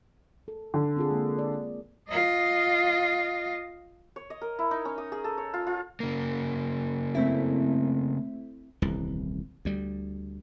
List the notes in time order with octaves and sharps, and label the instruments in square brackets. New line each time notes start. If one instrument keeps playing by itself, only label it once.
[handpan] A4
[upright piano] D3
[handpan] C4 F4 G#4
G#3 A#3
D5
[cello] F4 D#5
[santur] C#5
D#5
A#4
E4
D#4
C#4
D#6
G#4
A4
C#5
F4
F4
[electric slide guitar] C#3 A#3
[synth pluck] A3 C4 E4
[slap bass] D#1 C2 E3
D2 G3